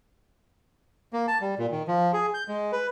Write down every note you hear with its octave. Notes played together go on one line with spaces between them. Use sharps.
A#3
A5
G3
A#2
D#3
F3
G#4
G6
G#3
B4